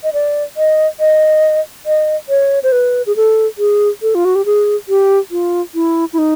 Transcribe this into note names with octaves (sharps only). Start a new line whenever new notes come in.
D#5
D5
D#5
D#5
D#5
C#5
C5
B4
G#4
A4
G#4
A4
F4
F#4
G4
G#4
G4
F4
E4
E4
D#4